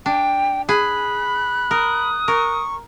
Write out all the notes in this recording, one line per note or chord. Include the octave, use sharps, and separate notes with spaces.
D4 G5
G#4 B5 F#6
A#4 D#6
A#4 C#6